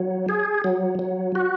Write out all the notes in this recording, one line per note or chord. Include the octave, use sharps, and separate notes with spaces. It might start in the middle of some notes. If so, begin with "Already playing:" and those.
Already playing: F#3
G#4
F#3
F#3
F#4